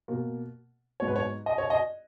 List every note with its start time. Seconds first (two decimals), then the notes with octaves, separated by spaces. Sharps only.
0.08 B2 A#3
1.00 G#2 F#3 B3 C#5
1.08 B4
1.16 C#5
1.46 D#5
1.58 C#5
1.70 D#5